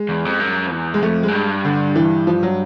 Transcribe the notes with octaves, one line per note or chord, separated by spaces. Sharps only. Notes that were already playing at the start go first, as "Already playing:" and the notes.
Already playing: G#3
E2
F2
F#2
F2
E2
G#3
F2 A3
F#2 G#3
G2
D3
E3
F3
F#3